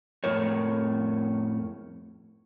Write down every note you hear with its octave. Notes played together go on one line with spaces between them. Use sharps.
F2 A2 A#4 C#5